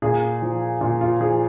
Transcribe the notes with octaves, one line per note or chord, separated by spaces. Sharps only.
A#2 G#4
F3
A#2 F4
F4
F3 G#4